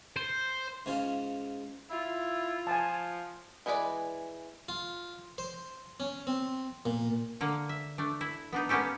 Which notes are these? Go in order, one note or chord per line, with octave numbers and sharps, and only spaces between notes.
C5
G#2 C#3 C#4 F4
E4 F4
F3 G#5 A5
E3 G#3 G#4 B4 D5
F4
C5
C#4
C4
A#2
D3 A#3 A#5
E5
A3 D4
E4
B3 D4 D#4
A#3 B3 C#4 G4 A4